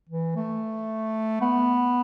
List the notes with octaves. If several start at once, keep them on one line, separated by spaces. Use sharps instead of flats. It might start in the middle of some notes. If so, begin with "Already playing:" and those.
E3
A3
B3